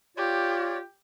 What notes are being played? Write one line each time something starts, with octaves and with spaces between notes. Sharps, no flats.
F4 G4 C#5 D5